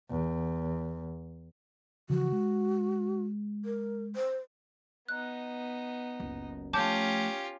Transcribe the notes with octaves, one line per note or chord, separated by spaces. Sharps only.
E2
C#3 E3 F3 F#4
G#3
A#4
C5
B3 D#4 F#6
F#1 C#2
F3 A3 C#4 F4 G4 A5 D6 G6